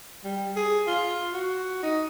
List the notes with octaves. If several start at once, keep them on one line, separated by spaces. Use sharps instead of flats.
G3
G#4
F4
F#4
D#4